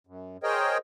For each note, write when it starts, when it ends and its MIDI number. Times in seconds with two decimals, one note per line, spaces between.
0.07 0.37 42
0.43 0.78 68
0.43 0.78 70
0.43 0.78 72
0.43 0.78 73
0.43 0.78 75
0.43 0.78 79